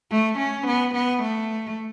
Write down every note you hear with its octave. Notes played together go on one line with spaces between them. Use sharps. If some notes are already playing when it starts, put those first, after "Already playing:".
A3
C#4
B3
B3
A3